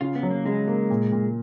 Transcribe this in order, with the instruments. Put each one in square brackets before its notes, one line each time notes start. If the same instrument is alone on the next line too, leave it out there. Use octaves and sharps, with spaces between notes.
[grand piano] C#3 [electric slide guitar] F4
[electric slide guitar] B3
[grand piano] F#3
[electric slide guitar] A#3
[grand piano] C#3 [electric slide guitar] G#3
[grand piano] A#3
A#2
A#2